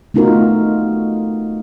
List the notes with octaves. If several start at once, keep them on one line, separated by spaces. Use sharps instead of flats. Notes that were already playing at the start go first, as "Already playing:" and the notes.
A3 B3 D#4 F4 F#4 A#4